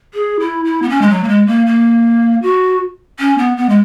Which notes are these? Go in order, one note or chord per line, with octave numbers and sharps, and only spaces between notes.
G#4
E4
E4
B3
C#4
G#3
F#3
A#3
G#3
A#3
A#3
F#4
C#4
B3
B3
G#3